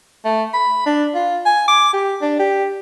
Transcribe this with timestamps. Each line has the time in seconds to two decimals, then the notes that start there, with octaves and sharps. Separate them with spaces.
0.25 A3
0.54 B5
0.86 D4
1.15 F4
1.46 G#5
1.68 D6
1.93 G4
2.22 D4
2.40 G4